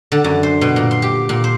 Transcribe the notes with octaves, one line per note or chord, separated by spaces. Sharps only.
D3
F#2
C5
B2
A#2
C6
G4
A#2
C5